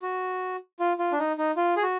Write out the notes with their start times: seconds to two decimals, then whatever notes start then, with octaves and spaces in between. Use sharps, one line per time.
0.02 F#4
0.80 F4
0.99 F4
1.12 D4
1.19 D#4
1.38 D#4
1.57 F4
1.76 G#4
1.83 F#4